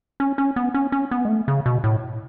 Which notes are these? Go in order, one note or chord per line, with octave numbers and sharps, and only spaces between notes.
C#4
C#4
B3
C#4
C#4
B3
G#3
A3
C#3
B2
A2